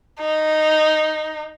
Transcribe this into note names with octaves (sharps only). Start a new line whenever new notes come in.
D#4